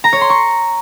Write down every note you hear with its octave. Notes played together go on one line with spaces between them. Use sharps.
A#5
C#5
C6
C#6